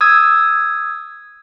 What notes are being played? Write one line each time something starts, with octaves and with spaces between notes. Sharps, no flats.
D#6 E6 G#6